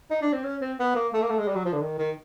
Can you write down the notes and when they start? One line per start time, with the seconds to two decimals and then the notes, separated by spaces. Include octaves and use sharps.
0.11 D#4
0.21 D4
0.33 C4
0.44 C#4
0.61 C4
0.79 B3
0.95 A#3
1.14 A3
1.22 A#3
1.30 A3
1.38 G#3
1.48 G3
1.56 F#3
1.65 F3
1.73 D3
1.82 D#3
1.98 D#3